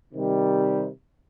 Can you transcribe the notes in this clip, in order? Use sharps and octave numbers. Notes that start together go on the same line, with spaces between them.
C3 D#3 G3